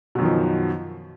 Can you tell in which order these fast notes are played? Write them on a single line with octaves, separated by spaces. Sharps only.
B2 F#2 D#3 F3